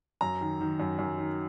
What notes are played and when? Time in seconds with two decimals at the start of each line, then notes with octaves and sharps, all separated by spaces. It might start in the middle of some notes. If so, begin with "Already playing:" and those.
0.21 F#2 A#5
0.41 D#3
0.61 D#3
0.80 F#2
0.99 F#2
1.18 D#3